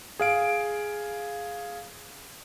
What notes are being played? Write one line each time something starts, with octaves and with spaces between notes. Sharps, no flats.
G#4 F5 D7